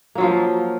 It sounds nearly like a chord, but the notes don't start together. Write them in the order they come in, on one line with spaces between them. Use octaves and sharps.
A#3 F#3 F4 F3